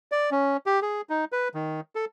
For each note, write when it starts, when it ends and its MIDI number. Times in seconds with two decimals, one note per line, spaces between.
0.12 0.30 74
0.31 0.57 61
0.66 0.80 67
0.82 1.01 68
1.10 1.25 63
1.32 1.48 71
1.54 1.80 51
1.95 2.05 69